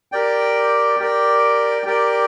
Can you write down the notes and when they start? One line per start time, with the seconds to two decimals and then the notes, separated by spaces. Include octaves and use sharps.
0.12 G4 A#4 D5 G5
1.00 G4 A#4 D5 G5
1.86 G4 A#4 D5 G5